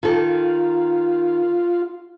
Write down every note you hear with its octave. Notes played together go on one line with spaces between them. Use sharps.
D#3 F4 A4